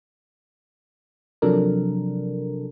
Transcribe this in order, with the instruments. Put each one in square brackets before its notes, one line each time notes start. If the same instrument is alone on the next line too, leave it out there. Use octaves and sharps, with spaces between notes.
[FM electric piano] C3 F3 F#3 D4 A4 A#4